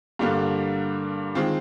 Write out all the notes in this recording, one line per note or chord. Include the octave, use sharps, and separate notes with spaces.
G2 D3 G3 A#3
D#3 G#3 C4 F4